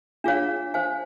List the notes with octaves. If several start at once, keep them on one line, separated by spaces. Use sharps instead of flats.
D4 F4 G#4 C#5 F5
C5 F5 G#5